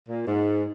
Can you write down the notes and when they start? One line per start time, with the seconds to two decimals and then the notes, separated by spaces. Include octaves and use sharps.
0.08 A#2
0.26 G#2